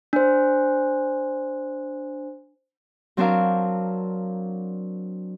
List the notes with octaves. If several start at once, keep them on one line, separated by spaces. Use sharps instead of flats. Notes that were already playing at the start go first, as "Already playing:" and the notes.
D4 C5
F#3 C4 D4 F#4 A#4 F5